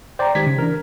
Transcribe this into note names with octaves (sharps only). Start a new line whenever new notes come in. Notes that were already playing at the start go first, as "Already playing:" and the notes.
C5 D5 G5 A#5
D#3 G#3 G4 G#6 B6
C#3
E3 D4 A#4